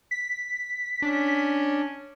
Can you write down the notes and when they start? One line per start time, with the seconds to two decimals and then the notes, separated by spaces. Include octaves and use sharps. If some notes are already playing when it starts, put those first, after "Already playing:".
0.11 B6
1.02 C#4 D4